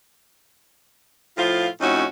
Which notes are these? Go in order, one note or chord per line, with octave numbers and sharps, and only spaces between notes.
A2 F3 F4
F2 A2 C#4 D#4 F#4